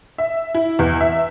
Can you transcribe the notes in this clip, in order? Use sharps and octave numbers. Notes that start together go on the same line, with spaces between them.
E5
E4
E2
E5